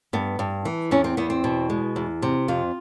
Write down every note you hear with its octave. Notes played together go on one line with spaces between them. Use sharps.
G2 B3
G2
E3
E2 C#4
C4
E2 B3
C4
B2
G#3
E2
C3
F2 F4